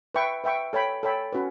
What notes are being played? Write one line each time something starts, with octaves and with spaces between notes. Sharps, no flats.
B4 E5 G5 C#6
B4 E5 G5 C#6
A4 C#5 G5 B5
A4 C#5 G5 B5
C#4 F#4 B4